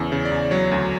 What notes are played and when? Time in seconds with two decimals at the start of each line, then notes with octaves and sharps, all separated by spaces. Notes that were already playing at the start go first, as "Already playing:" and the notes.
Already playing: E2 C#3
0.12 C#3
0.25 D5
0.32 E2
0.51 F#3 C#5
0.71 D2